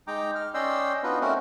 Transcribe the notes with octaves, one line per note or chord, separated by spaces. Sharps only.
G#3 D#4 G5 A#5 D6
F6
C#4 D5 D#5 G5 C6 E6
B3 D4 D#4 F4 F#4 B4
A3 C4 C#4 F#4 A#4